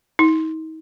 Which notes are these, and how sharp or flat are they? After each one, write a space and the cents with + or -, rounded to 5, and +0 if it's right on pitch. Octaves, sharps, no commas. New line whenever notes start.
D#4 +40